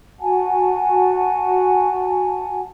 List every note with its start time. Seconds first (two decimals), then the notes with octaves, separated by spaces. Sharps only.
0.19 F#4 F#5 G#5 A5